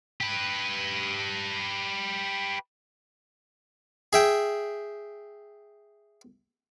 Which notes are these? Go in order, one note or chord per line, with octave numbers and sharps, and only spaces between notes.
G4 B4
G#4 E5 G5